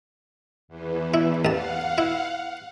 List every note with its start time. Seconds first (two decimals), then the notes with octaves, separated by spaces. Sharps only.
0.68 E2 E3
1.14 E4
1.45 A1 F5 F#5 A5
1.98 E4